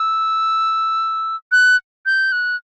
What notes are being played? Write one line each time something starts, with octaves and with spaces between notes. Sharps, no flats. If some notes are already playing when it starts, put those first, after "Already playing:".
Already playing: E6
F#6
G6
F#6